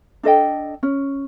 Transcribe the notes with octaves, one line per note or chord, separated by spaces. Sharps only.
D4 A4 D#5 G5
C#4